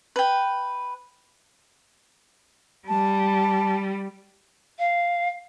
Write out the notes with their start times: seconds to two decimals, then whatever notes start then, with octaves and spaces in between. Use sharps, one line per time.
0.16 B4 G5
2.88 G3 A5
4.79 F5